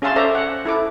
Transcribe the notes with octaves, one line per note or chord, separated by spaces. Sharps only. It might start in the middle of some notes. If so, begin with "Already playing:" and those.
C#4 G#4 E5 F5 A5 C6
A4 C5 D5 E5 A#5
F#5
E4 A4 D6